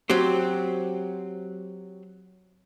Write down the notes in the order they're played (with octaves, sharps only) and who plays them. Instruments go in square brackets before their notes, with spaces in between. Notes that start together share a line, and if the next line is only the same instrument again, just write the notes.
[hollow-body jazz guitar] F#3 C4 G4 C5